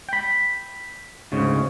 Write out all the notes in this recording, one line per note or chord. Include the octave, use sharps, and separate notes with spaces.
G5 B5
D2 G#2 C#3